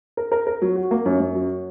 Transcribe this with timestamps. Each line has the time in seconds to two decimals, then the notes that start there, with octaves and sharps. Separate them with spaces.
0.17 A#4
0.32 A#4
0.47 A#4
0.62 F#3
0.76 F#4
0.91 A#3
1.06 F#2
1.20 F#2
1.35 F#3